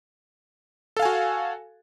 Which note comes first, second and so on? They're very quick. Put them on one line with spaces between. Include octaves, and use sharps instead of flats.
A4 F5 G#5 F#4